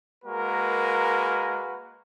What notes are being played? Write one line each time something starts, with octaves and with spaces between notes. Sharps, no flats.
G#3 A#3 F#4 A#4 B4